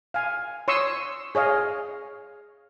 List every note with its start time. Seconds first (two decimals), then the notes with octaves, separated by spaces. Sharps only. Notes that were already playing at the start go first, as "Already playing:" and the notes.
0.14 F5 G#5
0.68 C#5 C6 C#6 D#6 E6
1.35 G#4 C#5 D#5 F5